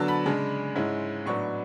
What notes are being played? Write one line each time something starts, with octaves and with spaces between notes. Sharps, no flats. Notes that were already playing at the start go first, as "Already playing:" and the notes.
Already playing: D3 F#3 B3 D4 A5
B5
C#3 G#3 D4
G#2 G#3 C#4 E4
A2 F#3 B3 D4 C#6